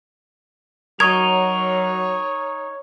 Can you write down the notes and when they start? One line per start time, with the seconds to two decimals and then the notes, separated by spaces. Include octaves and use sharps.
1.00 F#3 D#4 A#4 C#5 C#6 D#6 G#6